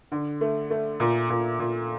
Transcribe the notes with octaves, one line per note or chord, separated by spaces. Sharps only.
D3
A3
A3
A#2
A#2
A#2